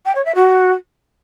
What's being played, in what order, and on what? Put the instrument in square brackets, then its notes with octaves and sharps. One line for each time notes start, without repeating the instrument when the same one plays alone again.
[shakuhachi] G5
C#5
E5
F#4